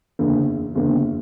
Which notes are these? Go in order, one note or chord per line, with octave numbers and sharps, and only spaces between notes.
F#1 E2 D3 A#3
F#1 E2 D3 A#3